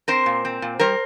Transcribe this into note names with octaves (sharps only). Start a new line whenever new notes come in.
C4 A#4 C5
A#2
C4
A#2
G3 A#4 C5